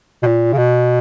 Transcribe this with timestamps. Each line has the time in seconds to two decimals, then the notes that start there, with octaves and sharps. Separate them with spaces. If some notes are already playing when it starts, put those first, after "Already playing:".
0.23 B2
0.26 A#2
0.53 C#3
0.58 B2